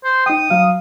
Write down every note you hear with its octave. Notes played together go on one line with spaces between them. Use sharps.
C5
D#4 G5 D#6
F#3 F5